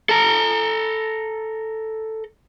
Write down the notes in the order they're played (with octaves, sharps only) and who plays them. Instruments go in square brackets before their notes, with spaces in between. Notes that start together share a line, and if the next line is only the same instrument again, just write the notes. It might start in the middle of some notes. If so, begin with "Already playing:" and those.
[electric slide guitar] A4 A#5